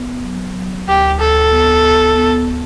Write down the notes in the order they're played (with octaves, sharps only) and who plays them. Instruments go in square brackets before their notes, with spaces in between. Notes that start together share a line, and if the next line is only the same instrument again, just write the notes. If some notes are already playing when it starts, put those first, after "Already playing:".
Already playing: [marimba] B3
F#3
F#3
[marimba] D2 [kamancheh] G4
[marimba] D2 [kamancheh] A4
[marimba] B3
B3
B3
B3